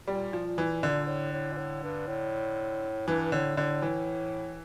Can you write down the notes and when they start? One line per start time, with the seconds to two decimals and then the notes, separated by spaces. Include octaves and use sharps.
0.08 A#2 G3
0.33 F3
0.46 A#2
0.58 E3
0.83 A#2 D3
1.08 A2
1.33 A2
1.53 A#2
1.57 A2
1.83 G2
2.07 A2
3.07 G2 E3
3.32 A2 D3
3.57 A2 D3
3.82 E3